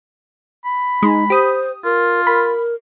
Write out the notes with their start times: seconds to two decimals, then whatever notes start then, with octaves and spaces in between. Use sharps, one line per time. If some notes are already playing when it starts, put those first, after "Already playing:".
0.65 B5
1.03 G#3 D#4
1.30 G4 C5 D#6
1.85 F4 A#4
2.27 A#4 B5